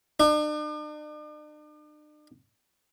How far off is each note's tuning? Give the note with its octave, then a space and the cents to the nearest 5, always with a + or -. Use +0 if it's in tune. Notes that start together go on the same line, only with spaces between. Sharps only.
D4 +45